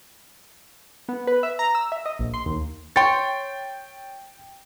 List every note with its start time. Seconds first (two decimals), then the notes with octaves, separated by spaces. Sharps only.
1.09 B3
1.27 B4
1.43 E5
1.59 A#5
1.75 E6
1.92 E5
2.06 D#5
2.19 A#1
2.34 C6
2.46 D#2
2.96 C#5 G5 C6 A6